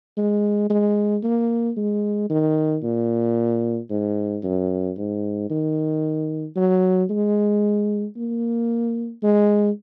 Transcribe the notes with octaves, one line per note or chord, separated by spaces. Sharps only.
G#3
G#3
A#3
G#3
D#3
A#2
G#2
F#2
G#2
D#3
F#3
G#3
A#3
G#3